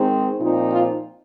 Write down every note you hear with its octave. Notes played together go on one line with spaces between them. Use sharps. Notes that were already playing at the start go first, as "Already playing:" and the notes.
Already playing: D#3 G#3 C4 D#4
A#2 F3 C4 D#4
F4